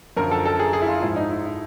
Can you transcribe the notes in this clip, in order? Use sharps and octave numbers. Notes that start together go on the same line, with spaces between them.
F#2 D3 F3 A#4
A4
A4
G#4
G#4
E4
F4
G#2 F3 E4
D#4
E4
E4